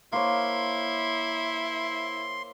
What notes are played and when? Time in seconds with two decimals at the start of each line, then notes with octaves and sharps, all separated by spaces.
0.12 A#3 E4 C5 C#5 C6